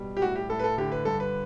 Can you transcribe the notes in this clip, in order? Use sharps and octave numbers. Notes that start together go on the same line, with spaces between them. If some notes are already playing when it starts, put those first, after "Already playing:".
Already playing: B2 G3
G4
A2 F#4
G4
A2 A4
B4
A4
D3 G4
B4
G2 A4
B4